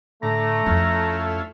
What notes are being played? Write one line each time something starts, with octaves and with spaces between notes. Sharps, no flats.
A2 D3 A3 A#5
F2 C#4 E4 F4